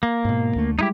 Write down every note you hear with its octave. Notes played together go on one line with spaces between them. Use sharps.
A#3
G#2 B2
D2 D3 A3
G3 G#3 D#4 E4 G4